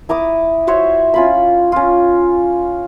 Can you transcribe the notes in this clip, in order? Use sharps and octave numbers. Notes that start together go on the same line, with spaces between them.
E4 A#5 D6 D#6
F#4 C5 C#5 E5
C#4 F4 B5
C#4 F4